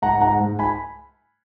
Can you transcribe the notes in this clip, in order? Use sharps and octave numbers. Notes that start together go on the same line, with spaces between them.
G#2 F#5 A#5
G#2 F#5 A#5
G#2
G#5 B5